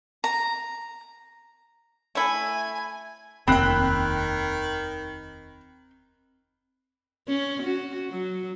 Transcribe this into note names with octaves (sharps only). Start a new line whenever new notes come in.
A#5
A3 E4 G#5
F1 D#2 D#3 C4 G5 B5 F#6
C#4
F#4
F#3